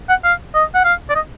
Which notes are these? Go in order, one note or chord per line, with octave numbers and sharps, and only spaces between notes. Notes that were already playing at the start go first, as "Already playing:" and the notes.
F#5
F5
D#5
F#5
F5
D5
D#5